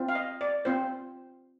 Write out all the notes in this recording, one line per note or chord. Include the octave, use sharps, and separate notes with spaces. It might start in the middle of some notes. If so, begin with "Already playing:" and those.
Already playing: C4 F4
F5
D#5
D5
C4 F4 C5